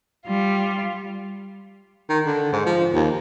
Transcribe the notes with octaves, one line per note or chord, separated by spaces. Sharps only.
G3 F4
D#3
D3
G#2
F3
D#2